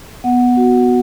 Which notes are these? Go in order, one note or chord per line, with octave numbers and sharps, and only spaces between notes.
B3 F#5
F#4